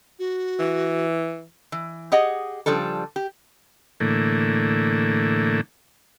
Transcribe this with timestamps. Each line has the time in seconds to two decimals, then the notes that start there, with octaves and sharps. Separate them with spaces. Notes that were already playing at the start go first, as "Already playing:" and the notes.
0.19 F#4
0.59 E3
1.72 E3
2.12 G4 G#4 D#5 F#5
2.66 C#3 F3 G3 D4 A4
3.16 G4
4.00 A2 D3 E3 A3 A#3